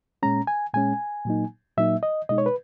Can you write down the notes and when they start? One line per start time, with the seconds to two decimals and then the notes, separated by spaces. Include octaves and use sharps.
0.23 A#2 G#3 C#4 A#5
0.47 G#5
0.74 A#2 G#3 C#4 G#5
1.25 A#2 F#3 A#3 D#4
1.77 A#2 F#3 A#3 D#4 E5
2.03 D#5
2.29 B2 G#3 D#4 D#5
2.38 C#5
2.46 B4